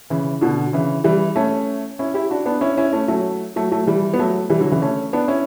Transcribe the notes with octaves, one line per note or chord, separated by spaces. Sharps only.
C#3 E3
B2 D3
C#3 E3
E3 G3
A3 C#4
C#4 E4
E4 G4
D4 F#4
B3 D4
C#4 E4
C#4 E4
A3 C#4
F#3 A3
F#3 A3
F#3 A3
E3 G3
B3
F#3 A3
E3 G3
D3 F#3
C#3 E3
A3 C#4
B3 D4
C#4 E4